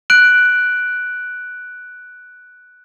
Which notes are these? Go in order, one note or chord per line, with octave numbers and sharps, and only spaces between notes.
F#6 D7 F#7